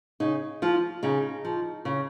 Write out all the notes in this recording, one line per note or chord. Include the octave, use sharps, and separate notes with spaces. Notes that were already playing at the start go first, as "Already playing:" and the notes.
C#3 D#4
F3 F4
C#3 D#4
F3
C#3